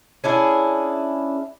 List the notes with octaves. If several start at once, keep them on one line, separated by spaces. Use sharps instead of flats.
C#4 D4 E4 G#4